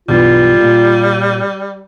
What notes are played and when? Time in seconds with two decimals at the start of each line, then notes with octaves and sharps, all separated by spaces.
0.09 B1 E2 G2 G3 F4
0.61 A#2 A#3